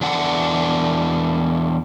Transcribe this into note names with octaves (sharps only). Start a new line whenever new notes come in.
E2 D4 F#5